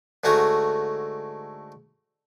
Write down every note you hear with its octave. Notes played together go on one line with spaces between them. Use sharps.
G#2 D3 A3 F#4 G#5 A#5